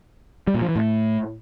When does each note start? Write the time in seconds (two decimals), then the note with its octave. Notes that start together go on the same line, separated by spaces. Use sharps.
0.47 G3
0.55 A#2
0.62 F3
0.69 E3
0.76 A2